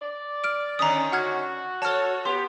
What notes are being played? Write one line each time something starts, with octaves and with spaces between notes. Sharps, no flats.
D5
F6 D7
D3 D#3 C#4 A#5 D#6
F#4 F#5 F6 G#6
A4 C#5 A5 F6
B3 G4 C6